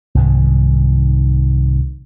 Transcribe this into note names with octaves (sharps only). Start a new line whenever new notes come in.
C2 G#2 D#3